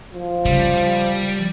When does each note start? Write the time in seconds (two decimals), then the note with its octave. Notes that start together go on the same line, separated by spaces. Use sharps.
0.13 F3
0.45 C#3 G3